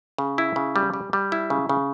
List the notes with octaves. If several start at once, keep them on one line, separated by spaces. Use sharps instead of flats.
C#3
E4
C#3
G3
G3
G3
E4
C#3
C#3